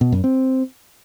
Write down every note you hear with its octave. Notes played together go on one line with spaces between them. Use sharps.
B2
F#2
C4